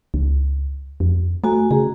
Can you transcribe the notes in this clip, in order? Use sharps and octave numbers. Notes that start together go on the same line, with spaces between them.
C#2
F2
A3 F#4 G#5 A#5
C#3 G#4